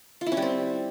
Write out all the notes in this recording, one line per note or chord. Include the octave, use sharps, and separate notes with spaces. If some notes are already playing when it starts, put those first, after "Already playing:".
F4
E4
C#4
G3
C4